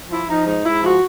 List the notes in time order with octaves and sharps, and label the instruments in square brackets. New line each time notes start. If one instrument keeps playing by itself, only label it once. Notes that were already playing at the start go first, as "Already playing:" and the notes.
[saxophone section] F3 E4
F3 D#4
G#2 D#4
G#2 E4
F3 F#4